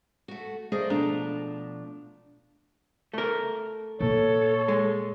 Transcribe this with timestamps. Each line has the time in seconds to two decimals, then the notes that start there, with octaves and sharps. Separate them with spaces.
0.28 A3 F#4
0.72 A3 A#3 G#4 C5 D5 D#5
0.90 B2 F3 A3 D4 A#5
3.13 A3 A#4
4.00 A#2 A4 C#5
4.68 G#3